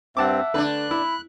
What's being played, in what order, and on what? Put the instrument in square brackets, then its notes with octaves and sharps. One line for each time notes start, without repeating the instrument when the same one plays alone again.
[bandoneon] G2 C4 [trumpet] E5 [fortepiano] F#5 A5 D6
[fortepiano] D3 A3 [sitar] D4 B4 [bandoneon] F#6
[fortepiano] E4 [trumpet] B5